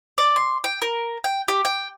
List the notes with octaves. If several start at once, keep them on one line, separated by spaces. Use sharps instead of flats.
D5
C6
G5
A#4
G5
G4
G5